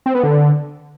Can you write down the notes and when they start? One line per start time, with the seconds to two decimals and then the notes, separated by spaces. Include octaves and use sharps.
0.06 C4
0.15 B3
0.24 D3